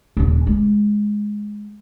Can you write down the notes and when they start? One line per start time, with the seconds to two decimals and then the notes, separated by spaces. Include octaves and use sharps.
0.17 D#1 D4
0.47 G#3